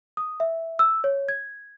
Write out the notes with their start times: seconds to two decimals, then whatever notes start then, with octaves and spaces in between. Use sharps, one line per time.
0.17 D#6
0.40 E5
0.79 E6
1.04 C#5
1.29 G#6